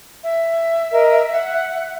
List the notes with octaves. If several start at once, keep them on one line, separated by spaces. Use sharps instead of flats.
E5
A#4 D#5
F#5